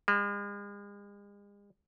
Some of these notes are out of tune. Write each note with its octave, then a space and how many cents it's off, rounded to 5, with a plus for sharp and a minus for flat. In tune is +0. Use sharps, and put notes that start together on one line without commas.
G#3 -45